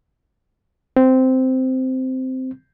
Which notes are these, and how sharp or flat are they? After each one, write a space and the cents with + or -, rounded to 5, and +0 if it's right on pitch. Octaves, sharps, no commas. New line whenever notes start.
C4 -10